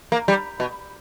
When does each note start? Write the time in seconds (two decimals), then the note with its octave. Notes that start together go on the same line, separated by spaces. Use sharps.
0.12 A#3
0.28 G3
0.60 B2